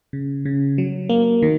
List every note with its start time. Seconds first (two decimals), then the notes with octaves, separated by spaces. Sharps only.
0.13 C#3
0.45 C#3
0.78 F#3
1.09 A#3
1.42 D#3